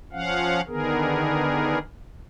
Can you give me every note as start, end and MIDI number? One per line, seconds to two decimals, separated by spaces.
0.12 0.61 53
0.12 0.61 61
0.12 0.61 77
0.12 0.61 78
0.68 1.78 50
0.68 1.78 51
0.68 1.78 59
0.68 1.78 68
0.68 1.78 70